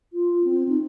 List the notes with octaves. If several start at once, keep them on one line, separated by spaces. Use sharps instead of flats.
F4
C4
D#4